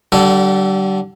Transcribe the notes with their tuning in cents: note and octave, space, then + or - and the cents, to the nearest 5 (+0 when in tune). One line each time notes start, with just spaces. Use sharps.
D3 +0 G3 -35 A4 +0